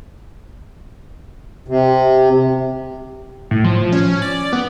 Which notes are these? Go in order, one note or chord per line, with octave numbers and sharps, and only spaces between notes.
C3
A2
F3
C#4
D5
B3